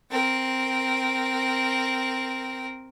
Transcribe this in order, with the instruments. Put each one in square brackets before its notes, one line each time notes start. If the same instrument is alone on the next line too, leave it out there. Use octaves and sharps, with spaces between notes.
[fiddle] C4 A#4